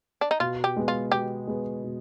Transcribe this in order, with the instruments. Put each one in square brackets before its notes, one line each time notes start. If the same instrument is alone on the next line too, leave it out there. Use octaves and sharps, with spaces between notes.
[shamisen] D4
D#4
[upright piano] B2 [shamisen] F4
[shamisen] G4
[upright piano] G#3 B3
[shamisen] F4
[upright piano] B2 [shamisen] G4
[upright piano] G#3 B3
B2